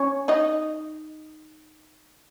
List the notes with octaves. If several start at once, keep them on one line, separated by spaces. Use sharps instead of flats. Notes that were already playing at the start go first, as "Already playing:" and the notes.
Already playing: C#4 C#5
D#4 D#5